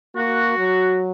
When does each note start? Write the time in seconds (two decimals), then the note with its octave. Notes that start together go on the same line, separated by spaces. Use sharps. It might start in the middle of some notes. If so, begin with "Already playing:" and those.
0.16 A#3 F#4
0.58 F#3